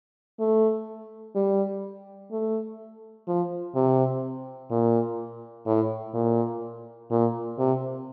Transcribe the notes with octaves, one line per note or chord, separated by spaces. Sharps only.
A3
G3
A3
F3
C3
A#2
A2
A#2
A#2
C3